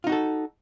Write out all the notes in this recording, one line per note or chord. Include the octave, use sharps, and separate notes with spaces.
D#4 F4 F#4 A4